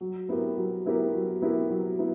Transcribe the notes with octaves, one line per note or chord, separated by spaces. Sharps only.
F#3
B3 E4 G4 A#4
F#3
B3 E4 G4 A#4
F#3
B3 E4 G4 A#4
F#3
B3 E4